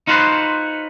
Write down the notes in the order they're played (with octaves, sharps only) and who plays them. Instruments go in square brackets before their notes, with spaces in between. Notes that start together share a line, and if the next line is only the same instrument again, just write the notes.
[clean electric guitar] D#4 F4 F#4 B4 C5 C6